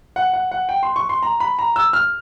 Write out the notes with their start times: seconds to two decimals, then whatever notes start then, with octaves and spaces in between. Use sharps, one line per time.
0.16 F#5
0.33 F#5
0.51 F#5
0.69 G5
0.83 C6
0.96 C#6
1.09 C6
1.22 A#5
1.40 B5
1.59 A#5
1.76 E6
1.93 F6